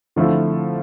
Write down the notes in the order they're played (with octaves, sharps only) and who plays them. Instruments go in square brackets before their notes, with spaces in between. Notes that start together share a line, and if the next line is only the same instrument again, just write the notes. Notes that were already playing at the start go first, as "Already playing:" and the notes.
[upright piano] D3 F3 A3 C4 E4